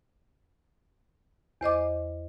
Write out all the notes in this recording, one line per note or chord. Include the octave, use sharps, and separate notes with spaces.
E2 C5 D#5 D6